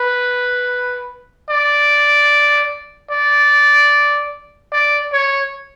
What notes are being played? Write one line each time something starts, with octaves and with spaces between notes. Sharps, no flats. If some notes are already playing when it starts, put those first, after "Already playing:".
Already playing: B4
D5
D5
D5
C#5